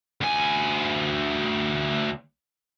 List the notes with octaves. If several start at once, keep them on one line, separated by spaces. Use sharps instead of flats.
D2 G#5